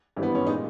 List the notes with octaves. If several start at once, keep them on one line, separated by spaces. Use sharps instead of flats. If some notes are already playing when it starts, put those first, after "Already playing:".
G#1 G2 E3 G3
B3
C#4
A#2 G#3 D#4